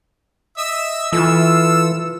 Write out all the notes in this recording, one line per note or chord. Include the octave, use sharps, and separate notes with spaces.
D#5 E5 E6
E3 F4 A4 E6